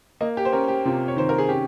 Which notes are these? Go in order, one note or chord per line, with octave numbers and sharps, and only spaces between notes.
A#3 D#5
G4
C5
C#4 A#4
G4
C3 F4
C#5
D#3 C5
A#4
G#4
C#4 G4